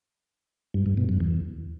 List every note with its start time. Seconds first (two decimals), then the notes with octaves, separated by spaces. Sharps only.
0.74 G2
0.86 G2
0.97 B2
1.09 F#2
1.20 E2